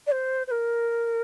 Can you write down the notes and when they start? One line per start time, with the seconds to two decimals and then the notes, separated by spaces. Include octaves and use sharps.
0.07 D5
0.12 C5
0.47 C5
0.51 A#4